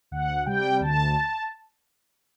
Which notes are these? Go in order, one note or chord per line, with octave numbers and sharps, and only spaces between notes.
D2 F#5
C3 G3 G5
D2 A5